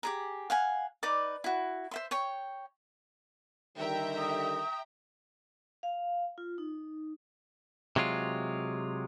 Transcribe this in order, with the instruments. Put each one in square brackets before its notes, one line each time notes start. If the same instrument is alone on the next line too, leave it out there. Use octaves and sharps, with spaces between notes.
[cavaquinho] G4 G#4 A#5
F5 F#5 G#5
D#4 B4 D5 D6
E4 F#4
C5 E5 C6
C#5 G5 C#6
[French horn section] D3 D#3 G3 [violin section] E5 G5 A#5
[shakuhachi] D#6
[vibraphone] F5
F4
D#4
[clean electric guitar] C3 F#3 G#3 F4